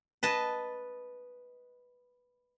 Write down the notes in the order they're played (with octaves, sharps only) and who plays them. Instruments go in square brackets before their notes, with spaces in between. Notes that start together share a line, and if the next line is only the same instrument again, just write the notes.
[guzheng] B4 D#5 A5